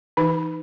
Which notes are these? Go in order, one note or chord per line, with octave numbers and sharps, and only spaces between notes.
E3 D#4